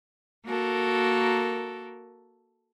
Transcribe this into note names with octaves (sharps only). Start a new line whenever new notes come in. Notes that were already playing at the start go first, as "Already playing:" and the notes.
A#3 F#4 A4 A#4